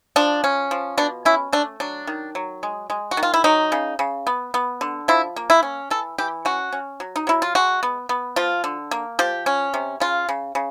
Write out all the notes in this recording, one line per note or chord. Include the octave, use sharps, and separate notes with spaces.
F3 D4
C#4
F3
B2 D4
C#4 E4
A3 D4
F#3 D4
D#3
F#3
G#3
G#3
F#4
D#3
F4
E4
F#3 D#4
C#3
C#3
B3
B3
D3
F3 E4
A#3
E4
C#4
E3 A4
E3 G4
C#4 F#4
C#4
F#3
D#4
F#3 E4
F4
G#3 F#4
B3
B3
F3 F4
D3
A#3
F3 G4
C#4
C3
C#3 F4
C#3
C#3